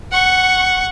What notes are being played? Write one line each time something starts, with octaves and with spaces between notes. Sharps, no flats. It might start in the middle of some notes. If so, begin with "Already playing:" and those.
F#5 C#6